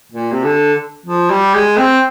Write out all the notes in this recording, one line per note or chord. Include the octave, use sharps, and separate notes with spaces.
A#2
C3
D3
F3
G3
G#3
C4